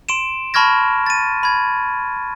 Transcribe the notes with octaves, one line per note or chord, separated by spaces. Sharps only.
C6 D7 E7
A5 B5 C#6 F6 G#6 A#6
A6 D#7
B5 G#6